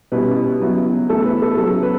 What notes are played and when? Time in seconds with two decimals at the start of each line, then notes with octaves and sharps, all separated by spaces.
0.12 B2 G3 C#4 E4 B4
0.60 C#3 F#3 B3 E4
1.09 A2 E3 B3 A4
1.26 B4
1.42 A4
1.58 C#3 F#3 B3 A4
1.83 B4